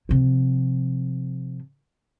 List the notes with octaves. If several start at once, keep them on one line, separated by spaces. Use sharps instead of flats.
C3 F3